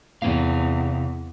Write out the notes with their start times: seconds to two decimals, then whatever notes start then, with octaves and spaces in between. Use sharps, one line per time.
0.22 E2 C3 C4 F5